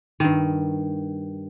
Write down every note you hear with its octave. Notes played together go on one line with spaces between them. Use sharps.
G2 D#3